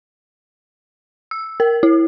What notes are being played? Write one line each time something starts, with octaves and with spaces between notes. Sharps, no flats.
E6
A#4
E4